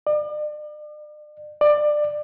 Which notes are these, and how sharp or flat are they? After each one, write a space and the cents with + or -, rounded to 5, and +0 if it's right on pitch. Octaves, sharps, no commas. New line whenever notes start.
D5 +40
D5 +20